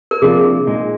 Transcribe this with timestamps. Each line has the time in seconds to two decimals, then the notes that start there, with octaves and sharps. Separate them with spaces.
0.11 A#4
0.22 C3 F3 A#3 D4 F4 G#4
0.67 A#2 G#3 D#4